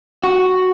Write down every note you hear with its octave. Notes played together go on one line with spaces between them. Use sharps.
F#4